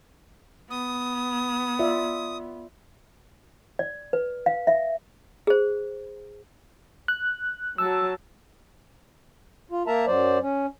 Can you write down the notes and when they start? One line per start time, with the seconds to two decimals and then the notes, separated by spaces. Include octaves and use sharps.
0.70 B3 D#6
1.79 F4 D5 E5
3.79 D5
4.13 B4
4.46 F5
4.67 E5
5.47 G#4 C5
7.08 F#6
7.78 F#3 A5 E6
9.71 F4
9.87 A#3 A#4 E5 A5 A#5
10.07 F#2 F#3 C5 D5
10.42 C#4